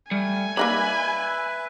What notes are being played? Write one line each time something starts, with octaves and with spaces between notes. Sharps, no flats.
G3 A3 G#5
A#3 D#4 B4 D5 E5 B5